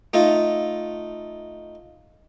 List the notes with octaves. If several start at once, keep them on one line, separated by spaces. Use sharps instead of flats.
A3 D#4 F4